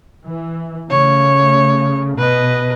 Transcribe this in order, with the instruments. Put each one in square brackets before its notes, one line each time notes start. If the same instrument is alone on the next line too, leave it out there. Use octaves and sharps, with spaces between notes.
[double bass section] E3
[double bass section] C#3 A3 [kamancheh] C#5
[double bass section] B2 [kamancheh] B4 D#5